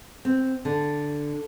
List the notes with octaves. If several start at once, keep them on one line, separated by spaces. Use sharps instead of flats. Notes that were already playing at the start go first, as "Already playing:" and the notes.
C4
D3